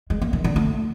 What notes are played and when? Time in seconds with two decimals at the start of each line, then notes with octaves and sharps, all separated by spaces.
0.10 G#3
0.21 A#3
0.33 D#3
0.44 D3
0.56 A3